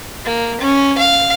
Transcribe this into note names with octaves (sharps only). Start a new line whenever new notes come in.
A#3
C#4
F5